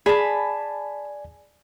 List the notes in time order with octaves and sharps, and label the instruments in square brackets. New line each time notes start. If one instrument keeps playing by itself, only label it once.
[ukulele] G#4 [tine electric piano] D5 G#5 [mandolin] A5 B5